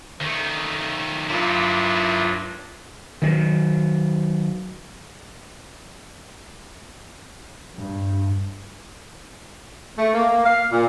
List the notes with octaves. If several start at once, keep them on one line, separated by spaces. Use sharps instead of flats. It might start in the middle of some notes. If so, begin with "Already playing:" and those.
D#3 A3
G2 F#3 A#3 E4 F4
D#3 F#3
G2
A3
A#3
F5
A#2